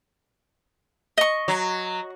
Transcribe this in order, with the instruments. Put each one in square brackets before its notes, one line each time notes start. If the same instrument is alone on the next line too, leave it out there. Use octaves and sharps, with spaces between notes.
[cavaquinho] D#5 C#6
[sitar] F#3